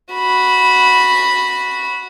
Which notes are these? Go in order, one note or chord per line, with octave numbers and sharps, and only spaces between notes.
F#4 B5